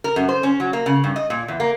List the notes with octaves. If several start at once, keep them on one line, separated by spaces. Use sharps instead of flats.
A#4
F#2
C5
C#4
F#3
A#3
C#3
G2
D#5
A#2
E2
A#3